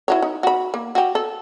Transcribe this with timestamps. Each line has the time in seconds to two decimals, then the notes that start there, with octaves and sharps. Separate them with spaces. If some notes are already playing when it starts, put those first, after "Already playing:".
0.08 E4 F#4 C#5
0.22 D#4
0.43 F#4 B5
0.74 A#3
0.95 F#4 G4
1.15 A4